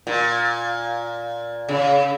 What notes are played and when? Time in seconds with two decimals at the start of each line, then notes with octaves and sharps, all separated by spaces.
0.07 A#2
1.69 C#3